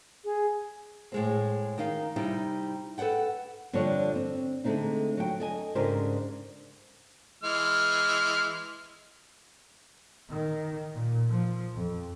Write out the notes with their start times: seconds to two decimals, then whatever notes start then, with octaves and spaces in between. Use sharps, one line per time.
0.25 G#4
1.12 A2 G#3 C4
1.78 D#3 D#4 F5
2.16 C3 G3 D#4 E4
2.98 A4 B4 D5 F#5 G5
3.73 G2 D3 F3 D4 C#5
4.15 C4
4.64 D3 G#3 A3 C4 D#4
5.17 F#3 G5
5.40 A4 D#5 G#5
5.75 G#2 C#3 D4 G4 A#4 C5
7.43 E3 G#3 F6
10.30 D#3
10.95 A#2
11.29 F3
11.74 F2